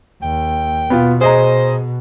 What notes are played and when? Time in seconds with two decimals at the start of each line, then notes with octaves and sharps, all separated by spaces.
0.23 D#2 G5
0.90 B2 B3 F4
1.21 G#4 C5 D#5 A#5